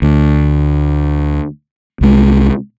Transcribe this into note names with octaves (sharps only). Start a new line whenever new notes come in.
D2
C2 G#3